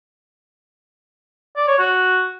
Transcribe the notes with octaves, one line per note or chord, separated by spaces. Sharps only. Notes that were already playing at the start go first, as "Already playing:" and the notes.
D5
C#5
F#4